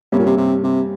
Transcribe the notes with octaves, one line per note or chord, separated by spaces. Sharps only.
G2 C3 G3 A#3 C#4 G4
A#2
C3
C3
C3